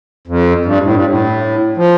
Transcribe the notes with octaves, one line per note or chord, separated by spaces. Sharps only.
F2
G2
A2
G2
A2
F3